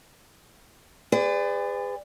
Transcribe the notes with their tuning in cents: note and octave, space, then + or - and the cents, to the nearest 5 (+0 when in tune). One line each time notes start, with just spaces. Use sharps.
G#4 -35 B4 +40 D5 +0